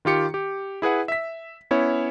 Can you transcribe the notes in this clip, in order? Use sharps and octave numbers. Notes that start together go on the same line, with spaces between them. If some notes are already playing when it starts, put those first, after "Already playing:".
D#3 F4 G4 C#7
G4
E4 G#4 B4 F#5
E5 B6
B3 C#4 E4 C#5